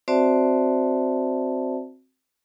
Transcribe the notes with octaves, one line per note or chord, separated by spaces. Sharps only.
C4 F#4 C5 D5 E5 A5